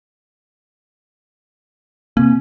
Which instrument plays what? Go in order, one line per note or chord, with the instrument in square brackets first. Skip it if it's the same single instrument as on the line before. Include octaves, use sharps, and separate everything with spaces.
[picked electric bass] C3 A#3 [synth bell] C4